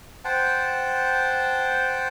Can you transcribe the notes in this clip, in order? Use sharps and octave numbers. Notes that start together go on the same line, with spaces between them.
C5 F#5 G5 A5